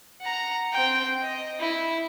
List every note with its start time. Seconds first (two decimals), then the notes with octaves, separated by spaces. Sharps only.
0.22 F#5 A#5
0.72 C4 G5
1.23 D#5
1.60 E4